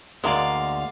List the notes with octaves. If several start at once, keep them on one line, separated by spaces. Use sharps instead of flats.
D2 G#3 A#3 A#4 D5 F5 A#5 C6